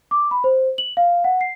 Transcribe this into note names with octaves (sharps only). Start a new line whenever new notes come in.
D6
B5
C5
F#7
F5
F#5
C7